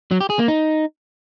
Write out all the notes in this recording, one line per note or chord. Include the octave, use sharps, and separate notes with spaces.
F#3
G4
G#4
A#3
D#4